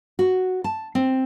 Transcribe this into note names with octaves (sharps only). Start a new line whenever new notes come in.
F#4
A5
C4